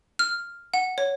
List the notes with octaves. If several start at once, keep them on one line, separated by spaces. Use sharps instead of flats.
F6
F#5
C#5